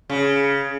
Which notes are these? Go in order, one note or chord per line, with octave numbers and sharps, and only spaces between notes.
C#3